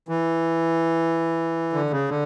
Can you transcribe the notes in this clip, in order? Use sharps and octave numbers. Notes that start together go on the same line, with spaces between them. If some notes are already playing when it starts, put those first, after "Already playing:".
E3
D3
C#3
D3